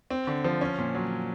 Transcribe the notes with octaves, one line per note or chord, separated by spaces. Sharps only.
C4
D3
F3
C#4
A#2
F#3